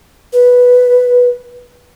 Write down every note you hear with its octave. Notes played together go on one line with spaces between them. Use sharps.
B4